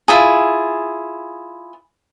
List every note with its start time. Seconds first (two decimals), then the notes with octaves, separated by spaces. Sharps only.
0.08 E4 F4 G#4